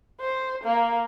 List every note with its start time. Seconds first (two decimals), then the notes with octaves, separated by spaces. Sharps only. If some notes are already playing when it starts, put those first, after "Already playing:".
0.21 C5
0.64 A#3